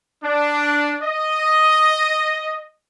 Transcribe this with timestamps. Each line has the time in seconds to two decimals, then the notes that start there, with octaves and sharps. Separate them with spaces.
0.25 D4
1.03 D#5